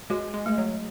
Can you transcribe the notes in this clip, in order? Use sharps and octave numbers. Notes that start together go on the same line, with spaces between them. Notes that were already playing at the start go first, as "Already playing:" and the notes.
G#3 F#4
G#3
G#3 A3
F#3